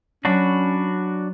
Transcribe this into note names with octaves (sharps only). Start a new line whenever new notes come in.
F#3 C#4 D4 F#4 B5